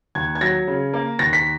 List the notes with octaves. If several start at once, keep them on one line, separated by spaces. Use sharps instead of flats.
D#2 G#6
G#6
F#3 A#6
C#3
A#3
D#2 A#6
B6